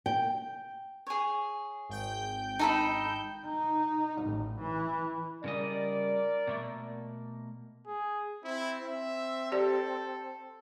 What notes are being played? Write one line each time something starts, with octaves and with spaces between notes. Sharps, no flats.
G5
G#4 C#5
G#1 G5 G6
D#4 A4 B5
D#4
A1
E3
C#3 G3 A#4 D5 D#5
B2 A3 A#3
G#4
C4 E4
C4 E5
G4 A4 D5